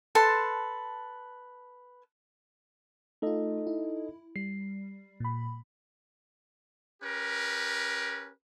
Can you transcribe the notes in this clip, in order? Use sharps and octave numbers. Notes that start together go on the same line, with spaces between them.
A4 B4 A5 C6
A3 D#4 F4 A4 D#5
E4
G3 C7
A#2 B5
C#4 G4 A#4 B4